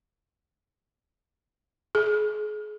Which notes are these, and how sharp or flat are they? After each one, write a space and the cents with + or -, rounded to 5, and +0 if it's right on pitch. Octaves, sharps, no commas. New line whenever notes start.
G#4 +30